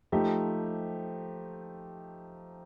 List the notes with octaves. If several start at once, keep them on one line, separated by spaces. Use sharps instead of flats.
F3 A3 D#4 G4